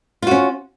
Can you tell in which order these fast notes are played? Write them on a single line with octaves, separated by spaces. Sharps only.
F4 F#4 C#4